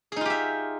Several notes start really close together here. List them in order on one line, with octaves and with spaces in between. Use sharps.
G#4 D#4 F4 G4 E5